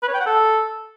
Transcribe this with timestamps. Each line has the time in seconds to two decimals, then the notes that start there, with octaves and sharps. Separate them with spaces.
0.02 B4
0.08 C#5
0.14 G5
0.20 F#5
0.26 A4